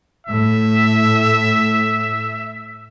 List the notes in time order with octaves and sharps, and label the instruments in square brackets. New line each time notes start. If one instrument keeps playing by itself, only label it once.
[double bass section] A2 [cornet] E5